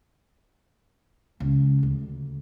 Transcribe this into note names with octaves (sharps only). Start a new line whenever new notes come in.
C#2
D2